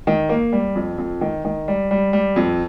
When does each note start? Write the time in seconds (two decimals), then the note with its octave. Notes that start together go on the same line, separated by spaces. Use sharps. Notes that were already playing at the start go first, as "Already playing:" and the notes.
0.07 D#3
0.29 A#3
0.52 G3
0.76 F2
0.98 F2
1.21 D#3
1.45 D#3
1.68 G3
1.91 G3
2.13 G3
2.36 F2